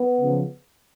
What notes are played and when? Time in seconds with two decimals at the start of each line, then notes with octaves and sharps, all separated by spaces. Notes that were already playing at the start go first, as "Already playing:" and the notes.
Already playing: B3
0.19 C#3 F3